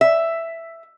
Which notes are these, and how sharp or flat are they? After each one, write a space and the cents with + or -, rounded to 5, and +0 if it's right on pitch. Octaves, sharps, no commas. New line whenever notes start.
E5 +5